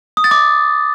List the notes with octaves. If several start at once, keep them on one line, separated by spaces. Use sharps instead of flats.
D#6
A6
D6